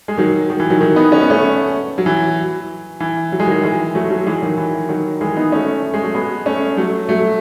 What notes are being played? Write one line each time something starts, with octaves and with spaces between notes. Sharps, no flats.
G#3
D#3 F#3
D#3
E3
D#3 F#3
D#3 F#3
B3 D#4
C#4
B3
A3 C#4
F#3
E3
E3
F#3
G#3
D#3 F#3
E3 G#3
F#3 A3
F#3 A3
E3 G#3
D#3 F#3
E3
D#3 F#3
E3 G#3
B3 D#4
A3 C#4
A3
G#3
F#3 A3
G#3 B3
A3 C#4
F#3 A3
F#3 A3